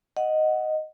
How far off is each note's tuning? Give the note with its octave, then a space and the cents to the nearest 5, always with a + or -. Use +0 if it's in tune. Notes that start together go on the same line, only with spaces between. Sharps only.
D#5 +0 F#5 +0